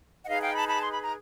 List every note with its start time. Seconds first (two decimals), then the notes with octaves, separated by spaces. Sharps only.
0.22 F#5
0.26 D#4 G#4 B4 D#5 F5
0.40 F5 G5
0.54 A5 B5
0.67 A5 B5
0.81 C6
0.91 B5
1.02 A#5